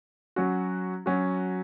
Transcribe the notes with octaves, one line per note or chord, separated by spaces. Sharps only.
F#3 C#4 F#4
F#3 C#4 F#4